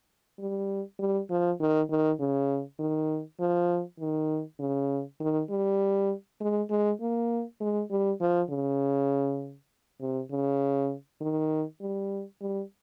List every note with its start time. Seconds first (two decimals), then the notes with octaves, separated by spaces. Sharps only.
0.39 G3
0.99 G3
1.30 F3
1.60 D#3
1.90 D#3
2.20 C#3
2.79 D#3
3.40 F3
4.00 D#3
4.59 C#3
5.20 D#3
5.50 G3
6.40 G#3
6.70 G#3
7.01 A#3
7.61 G#3
7.90 G3
8.20 F3
8.50 C#3
10.00 C3
10.31 C#3
11.21 D#3
11.81 G3
12.41 G3